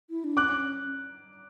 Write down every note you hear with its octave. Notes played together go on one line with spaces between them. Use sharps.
E4
D4
C#4 D6 F#6